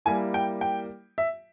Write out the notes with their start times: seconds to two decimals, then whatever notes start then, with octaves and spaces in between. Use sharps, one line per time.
0.05 G3 A#3 E4 G#5
0.34 G5
0.61 G5
1.18 E5